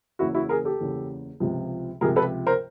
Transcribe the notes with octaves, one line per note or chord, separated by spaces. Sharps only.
F#1 E2 C#3 E4 F#4
E4 F#4
G#4 A#4
G4 A4
F#1 E2 C#3
C#2 C3 F3
C#2 C3 F3 G#4 A#4
A4 B4
A#4 C5